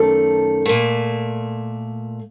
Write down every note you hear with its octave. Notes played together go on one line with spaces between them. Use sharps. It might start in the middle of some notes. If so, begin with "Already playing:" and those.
Already playing: F#2 D#3 A3 A4
A#2 A3